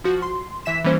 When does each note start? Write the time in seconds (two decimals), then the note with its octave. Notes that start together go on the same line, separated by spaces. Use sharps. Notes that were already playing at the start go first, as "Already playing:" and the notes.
0.04 F3 F#4
0.22 C6
0.66 E3 E5 B6 E7
0.84 E3 G3 A#3 C#4 C5